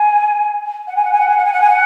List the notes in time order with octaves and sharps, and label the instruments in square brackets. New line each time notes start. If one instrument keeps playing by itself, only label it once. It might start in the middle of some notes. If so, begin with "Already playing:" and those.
Already playing: [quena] G#5
F#5
G#5
F#5
G#5
F#5
G#5
F#5
G#5
F#5
G#5
F#5